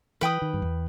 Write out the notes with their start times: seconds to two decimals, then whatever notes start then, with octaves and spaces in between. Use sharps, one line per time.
0.21 E3 B4 G5 B5 D#6
0.42 D#3
0.54 G2
0.62 E2